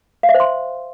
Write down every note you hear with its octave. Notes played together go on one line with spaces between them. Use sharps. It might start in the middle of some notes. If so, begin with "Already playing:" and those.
F5
E5
C5
C6